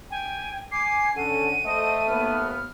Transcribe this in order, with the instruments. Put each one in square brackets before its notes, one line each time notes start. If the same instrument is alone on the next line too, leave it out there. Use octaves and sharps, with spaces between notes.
[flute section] G5 [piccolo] G#5
[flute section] G#5 D6 G#6 [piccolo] C7
[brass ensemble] D3 C#4 [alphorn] A4 [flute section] F#5 [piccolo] D#7
[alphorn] A3 [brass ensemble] A4 C5 D#5
[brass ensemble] D#2 B3 [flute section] F6